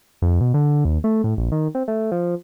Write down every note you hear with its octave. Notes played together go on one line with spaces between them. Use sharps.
F2
B2
D3
D#2
A3
A2
A#1
D#3
C4
A3
F3